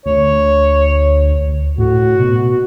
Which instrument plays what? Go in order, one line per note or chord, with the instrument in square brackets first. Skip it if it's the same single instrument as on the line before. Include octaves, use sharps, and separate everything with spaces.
[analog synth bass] D2 [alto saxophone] C#5
[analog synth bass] A2 [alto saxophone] F#4
[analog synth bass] B2